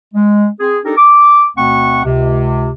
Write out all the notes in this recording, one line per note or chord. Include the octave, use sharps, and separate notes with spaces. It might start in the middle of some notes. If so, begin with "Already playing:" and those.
G#3
C4 G#4
D4 D#4 G4 A4 A#4
D6
D2 B2 A3 C4 F#5 C#6
C#2 C3